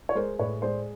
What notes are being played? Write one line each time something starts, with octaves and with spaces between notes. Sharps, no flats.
C#5
G#3 A#4 C5
A2 B4 C#5
G#3 C5 D5